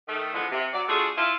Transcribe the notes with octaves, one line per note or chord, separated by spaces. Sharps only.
D#3 A3
E2 D3 F3 G#3 B3
C3
F#3 D5
A3 D4 F4 F#4 G#4
E4 F4